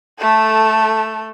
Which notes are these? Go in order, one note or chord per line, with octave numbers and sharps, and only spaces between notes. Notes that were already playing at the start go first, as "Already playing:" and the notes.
A3 A4